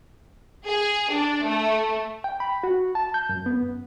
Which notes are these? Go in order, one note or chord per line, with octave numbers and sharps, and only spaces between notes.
G#4
D4
A3
G5
B5
F#4
A5
G6
F#2
B3
F#2